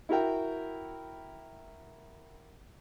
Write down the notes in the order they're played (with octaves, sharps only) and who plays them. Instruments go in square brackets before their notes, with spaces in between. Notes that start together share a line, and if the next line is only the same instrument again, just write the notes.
[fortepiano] E4 F#4 A#4 G5